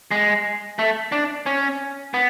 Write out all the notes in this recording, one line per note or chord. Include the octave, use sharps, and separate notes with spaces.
G#3
A3
D4
C#4
B3